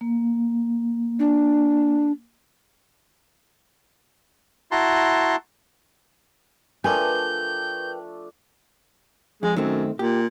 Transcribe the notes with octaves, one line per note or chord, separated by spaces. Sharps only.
A#3
D4
E4 F#4 A5 A#5 C6
F3 A3 D4 A#4 B4 G5 G#5 G6
F2 G#3
F#2 D#3 A3 C4
A#2 G4